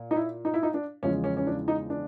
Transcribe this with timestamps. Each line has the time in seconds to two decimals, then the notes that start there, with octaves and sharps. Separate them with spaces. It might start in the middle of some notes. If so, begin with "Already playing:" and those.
Already playing: A#2
0.11 D#4
0.16 E4
0.45 D#4
0.54 E4
0.63 D#4
0.74 D4
1.03 E2 C#3 F3 G#3 C#4
1.24 C#4
1.37 C#4
1.47 D4
1.68 D#4
1.90 D4